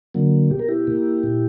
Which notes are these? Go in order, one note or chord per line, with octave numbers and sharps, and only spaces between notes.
D3 F#3 A#3
B2 G4
A#4
E4 G4
A#3
A#2